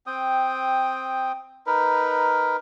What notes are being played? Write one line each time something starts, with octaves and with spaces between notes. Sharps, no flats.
C4 G5 D#6
D#4 A#4 B4